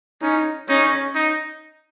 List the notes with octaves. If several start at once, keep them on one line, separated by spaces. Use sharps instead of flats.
C#4 D#4
C#4 D#4
D#4